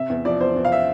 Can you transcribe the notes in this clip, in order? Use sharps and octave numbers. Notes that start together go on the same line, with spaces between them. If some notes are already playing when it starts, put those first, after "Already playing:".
Already playing: C3 E5
E2
F3 D5
E2 C5
E2
F5
E5